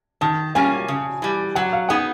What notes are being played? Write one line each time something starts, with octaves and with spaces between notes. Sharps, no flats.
D#3 A5
G3 A#3 C#4 F4 G#5
C#3
E3 G3
F#3 F#5
F5
B3 D#4 G#4 F#5